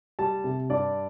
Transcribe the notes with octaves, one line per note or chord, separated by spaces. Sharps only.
G3 A5
C3
G2 D5